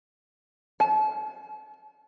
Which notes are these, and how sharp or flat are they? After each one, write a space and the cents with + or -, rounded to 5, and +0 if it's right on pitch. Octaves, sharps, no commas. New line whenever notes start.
A5 -40